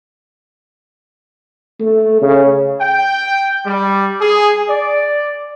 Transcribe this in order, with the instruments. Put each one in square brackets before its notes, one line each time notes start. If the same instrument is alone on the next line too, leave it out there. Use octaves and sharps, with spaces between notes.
[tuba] A3
C#3
[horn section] G5
G3
G#4
D5